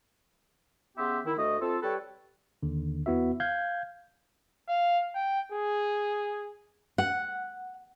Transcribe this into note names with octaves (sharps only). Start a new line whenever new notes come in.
C#3 B3 G4 E5 C6
D#3 E4
D2 A3 D#5
C4 F4 A4
G3 A4 B4 C#5 G5
D#2 D3
E2 B3 E4 F#4 E5
F5 G6 G#6
F5
G5
G#4
F#5